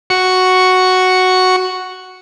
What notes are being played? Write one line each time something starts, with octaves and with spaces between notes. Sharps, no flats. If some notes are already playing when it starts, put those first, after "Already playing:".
F#4 C#6